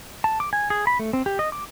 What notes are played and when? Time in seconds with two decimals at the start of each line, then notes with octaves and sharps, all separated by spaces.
0.24 A5
0.40 D6
0.53 G#5
0.70 G#4
0.87 B5
0.99 A3
1.13 C4
1.26 G4
1.39 D#5
1.52 D6